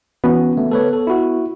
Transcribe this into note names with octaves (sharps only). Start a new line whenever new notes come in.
E3 B3 C#4 F#4
D3 A3
A4 B4 C#5
A4
E4 F#4